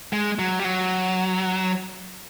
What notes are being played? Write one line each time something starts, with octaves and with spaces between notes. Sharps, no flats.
G#3
F#3
G3
F#3